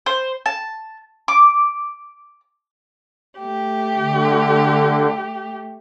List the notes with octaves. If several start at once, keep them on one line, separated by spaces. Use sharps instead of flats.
C5
A5
D6
A3 G4
D3